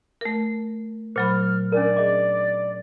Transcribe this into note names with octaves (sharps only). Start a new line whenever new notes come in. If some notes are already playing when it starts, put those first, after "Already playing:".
A3 A#4
A#2 F#3 C5 B5 F6
C#4 D4 A#4 D5
G#4 D#5 D6